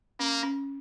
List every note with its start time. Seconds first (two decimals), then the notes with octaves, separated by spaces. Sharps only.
0.19 A#3 C#4
0.43 C#4